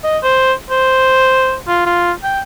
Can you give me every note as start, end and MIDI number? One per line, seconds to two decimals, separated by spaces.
0.04 0.18 75
0.23 0.53 72
0.71 1.56 72
1.68 1.83 65
1.86 2.12 65
2.24 2.41 79